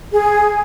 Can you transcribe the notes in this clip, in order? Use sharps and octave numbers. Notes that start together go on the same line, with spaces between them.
G#4